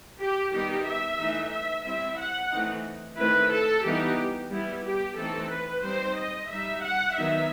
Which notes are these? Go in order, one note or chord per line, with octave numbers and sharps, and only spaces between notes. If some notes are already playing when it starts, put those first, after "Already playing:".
G4
D#3 G3 B3 D#4 G4
E5
E3 A3 D#4
E5
G3 C4 E4 E5
F#5
E3 A3 C4 D#4
D#3 A3 C4 E4 B4
A4
E3 G3 B3 D#4 G4
G3 B3 E4
G4
E3 A3 C4 D#4 A4
B4
G3 C4 D#4 C5
D#5
G3 D#4 E5
F#5
D#3 F#3 B3 D#4 E5